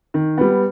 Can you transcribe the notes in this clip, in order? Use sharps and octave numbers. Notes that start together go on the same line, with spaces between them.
D#3
G3 B3